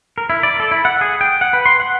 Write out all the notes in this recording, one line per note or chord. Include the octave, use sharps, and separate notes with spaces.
A#4
E4
D5
A4
E4
F#5
G#4
G5
F#5
B4
C6
F#5